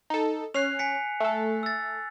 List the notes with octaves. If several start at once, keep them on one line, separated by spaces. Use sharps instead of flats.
D#4 A4
C#4 F#6 C7 F7
G#5 B6 C#7
A3 A4
E6 A6